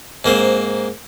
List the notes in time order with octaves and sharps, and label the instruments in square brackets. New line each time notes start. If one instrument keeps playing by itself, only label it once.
[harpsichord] G#2 A#3 C4